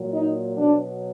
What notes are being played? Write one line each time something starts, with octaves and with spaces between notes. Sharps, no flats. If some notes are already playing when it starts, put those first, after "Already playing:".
Already playing: A#2 F#3
D#4
B2 F#3 D4